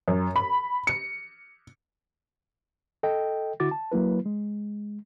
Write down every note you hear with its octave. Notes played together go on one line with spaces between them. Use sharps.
F#2
B5
C#7
A4 D#5 G5
D3 E4 F#4 D6 A6
A5
F#3 A#3 E4 B4
G#3